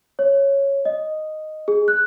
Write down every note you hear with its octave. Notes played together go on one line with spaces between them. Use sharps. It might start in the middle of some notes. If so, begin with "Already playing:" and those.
C#5
D#5
G#4
F#6